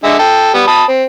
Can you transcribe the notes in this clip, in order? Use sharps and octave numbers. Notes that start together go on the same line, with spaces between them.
D3 G#3 E5
A4 G5
G3 B3
A5 B5 D#6
C4